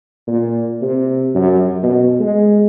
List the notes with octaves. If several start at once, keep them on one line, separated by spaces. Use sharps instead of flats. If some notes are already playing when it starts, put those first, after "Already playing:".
A#2
C3
F#2
B2
G#3